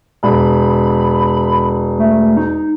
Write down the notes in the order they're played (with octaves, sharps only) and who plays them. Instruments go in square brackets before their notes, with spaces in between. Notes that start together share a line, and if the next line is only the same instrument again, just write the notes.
[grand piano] E1 [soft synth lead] B5
[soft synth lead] A3
D#4